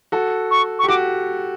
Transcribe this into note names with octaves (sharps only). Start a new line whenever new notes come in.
F#4 A4
C#6
C#6
G4
F#4 D6